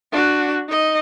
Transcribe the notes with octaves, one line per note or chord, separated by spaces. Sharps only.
D4 F#4
D#4 D#5